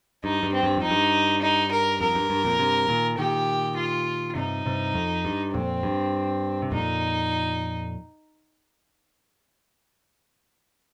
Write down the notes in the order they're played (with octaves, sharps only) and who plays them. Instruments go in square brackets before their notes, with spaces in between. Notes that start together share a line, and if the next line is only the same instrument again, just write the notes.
[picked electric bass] G2 [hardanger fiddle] D#4
[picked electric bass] G2
[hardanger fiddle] C4
[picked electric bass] G2
[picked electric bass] F2 [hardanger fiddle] D#4
[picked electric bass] G2
[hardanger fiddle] D#4
A#4
[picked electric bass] F2 [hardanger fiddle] A#4
[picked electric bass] G2
G2
F2 A#2
G2 C3
A#2 D#3
[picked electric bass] A#2 D#3 [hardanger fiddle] G4
[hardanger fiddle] F4
[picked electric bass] G2 C3 [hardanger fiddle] D#4
[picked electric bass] G2 C3
F2
G2
[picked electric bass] F2 A#2 [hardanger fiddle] C4
[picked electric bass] G2
C3
[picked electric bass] F2 A#2 [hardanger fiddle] D#4